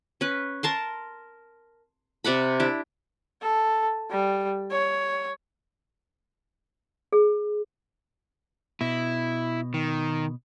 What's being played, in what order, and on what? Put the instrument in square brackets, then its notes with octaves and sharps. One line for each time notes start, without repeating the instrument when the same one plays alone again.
[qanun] C#4 B4
A#4 A5 C6
C3 D5 F#5 B5
D4 E4 G4
[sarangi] A4
G3
C#5
[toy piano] G#4
[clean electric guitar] B2 [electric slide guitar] E4
[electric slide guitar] D#3